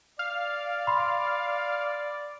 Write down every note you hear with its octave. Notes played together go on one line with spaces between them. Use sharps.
D5 F5
B5 C6